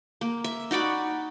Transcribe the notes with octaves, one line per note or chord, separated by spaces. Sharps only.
A#3
E5
D#4 F#4 D5 B5